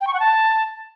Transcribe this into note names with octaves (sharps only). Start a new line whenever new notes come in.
G5
C#6
F#5
A5